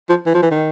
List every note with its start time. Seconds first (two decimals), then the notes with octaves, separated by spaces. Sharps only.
0.09 F3
0.26 E3
0.34 F3
0.42 E3
0.51 D#3